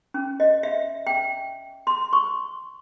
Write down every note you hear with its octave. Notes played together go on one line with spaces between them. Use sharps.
C#4
D#5
E5
G5
C6
C#6